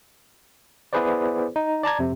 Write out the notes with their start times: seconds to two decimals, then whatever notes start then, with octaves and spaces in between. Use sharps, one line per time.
0.93 B3 E4 G#4 B4 C5 D5
1.56 D#4
1.83 D5 A5 A#5 G#6
1.99 F2 C3